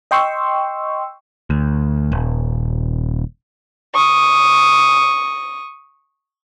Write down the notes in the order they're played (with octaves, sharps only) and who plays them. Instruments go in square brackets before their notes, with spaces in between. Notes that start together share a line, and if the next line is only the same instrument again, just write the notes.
[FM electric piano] D#5 G5 C6 C#6 E6
[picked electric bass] D2
D#1
[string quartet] C#6 D#6